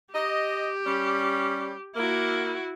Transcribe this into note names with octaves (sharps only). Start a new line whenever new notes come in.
G4 D#5
G3 C#4
A#3 E4 F#4